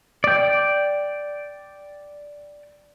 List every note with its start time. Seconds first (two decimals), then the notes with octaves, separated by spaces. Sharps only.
0.24 D5 G5